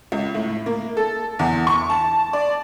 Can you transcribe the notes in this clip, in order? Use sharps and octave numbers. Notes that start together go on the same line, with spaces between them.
C#2
A2
A#3
A4
E2
C#6
A5
D5